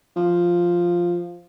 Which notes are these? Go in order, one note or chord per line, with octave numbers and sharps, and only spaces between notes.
F3